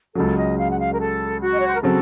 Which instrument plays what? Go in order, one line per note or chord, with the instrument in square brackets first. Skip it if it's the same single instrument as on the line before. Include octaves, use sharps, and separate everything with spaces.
[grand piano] C#2 C#3 F#3 [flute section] A4
[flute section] D#5
F5
F#5
F5
A#4
A4
F#4
D#5
C#5
C5
A#4
[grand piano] C#3 F#3 C4 F#4 [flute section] A4